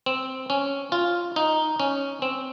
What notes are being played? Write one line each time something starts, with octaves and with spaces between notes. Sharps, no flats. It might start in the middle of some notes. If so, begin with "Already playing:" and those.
C4
C#4
F4
D#4
C#4
C4